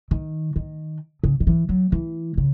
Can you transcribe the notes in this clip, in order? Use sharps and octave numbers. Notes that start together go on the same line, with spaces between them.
D#3
D#3
C#3
D#3
E3
F#3
E3
C#3